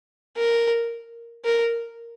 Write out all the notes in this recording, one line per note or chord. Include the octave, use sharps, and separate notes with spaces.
A#4
A#4